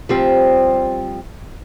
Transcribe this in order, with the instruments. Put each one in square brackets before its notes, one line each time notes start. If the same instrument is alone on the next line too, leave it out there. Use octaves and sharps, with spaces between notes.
[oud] F3 G3 C4